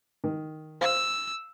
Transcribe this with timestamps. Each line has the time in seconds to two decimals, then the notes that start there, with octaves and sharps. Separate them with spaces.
0.24 D#3
0.81 C5 F5 E6